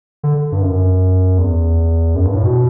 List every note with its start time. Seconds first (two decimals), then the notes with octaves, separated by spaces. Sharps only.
0.23 D3
0.52 G2
0.61 F#2
1.38 E2
2.15 F#2
2.25 G2
2.34 A2
2.44 B2